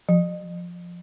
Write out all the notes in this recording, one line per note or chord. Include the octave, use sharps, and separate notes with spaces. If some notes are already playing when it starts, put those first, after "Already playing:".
F3